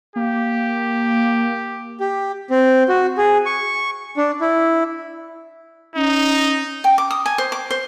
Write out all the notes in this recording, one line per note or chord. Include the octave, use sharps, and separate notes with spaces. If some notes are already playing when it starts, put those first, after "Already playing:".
A#3 G4
G4
C4
F#4
G#4
C#6
D4
E4
C#4 D#4
G5
D6
D#6
G#5
C5
D6
C5